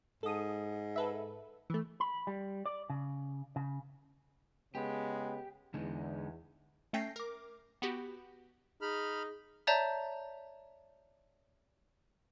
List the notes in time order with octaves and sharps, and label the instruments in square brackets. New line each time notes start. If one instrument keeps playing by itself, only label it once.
[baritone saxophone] G#2 [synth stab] A4 D#6
[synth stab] A4 B4 E5
E3 A3
[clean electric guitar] B5
G3
D5
C#3
C#3
[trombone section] C#3 G#3 B3 [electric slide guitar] G4
[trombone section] E2 [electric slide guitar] D3 G#3 D#4
[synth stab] A3 C#4 G5 G6 A#6 C7
A#4 D6
B3 F#4 G4
[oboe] D#4 [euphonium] G#4 [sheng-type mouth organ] B5 F6
[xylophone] C#5 D5 E5 A5 A#5 G6